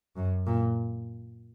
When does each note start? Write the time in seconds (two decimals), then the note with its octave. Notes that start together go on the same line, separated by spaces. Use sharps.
0.16 F#2
0.47 A#2